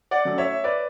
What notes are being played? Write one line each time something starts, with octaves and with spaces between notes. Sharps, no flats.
D5 F#5
F#3 A3 C#4
C#5 E5
B4 D5